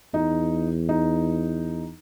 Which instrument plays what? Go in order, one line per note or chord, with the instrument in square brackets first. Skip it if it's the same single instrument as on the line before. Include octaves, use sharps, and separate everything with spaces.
[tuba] E2 [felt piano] D#4
[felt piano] D#4